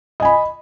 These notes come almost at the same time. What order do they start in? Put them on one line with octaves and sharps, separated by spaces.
D#5 G#5 B5